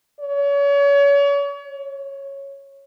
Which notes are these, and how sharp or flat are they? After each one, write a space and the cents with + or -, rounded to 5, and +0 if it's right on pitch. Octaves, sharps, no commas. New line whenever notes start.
C#5 +35
C#5 -10